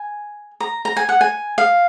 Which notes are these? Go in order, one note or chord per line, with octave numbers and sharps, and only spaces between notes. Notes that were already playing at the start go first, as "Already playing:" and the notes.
Already playing: G#5
A#5
A#5
G#5
F#5
G#5
F5